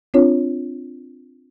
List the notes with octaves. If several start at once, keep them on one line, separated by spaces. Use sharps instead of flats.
C4 D4 F4 C#5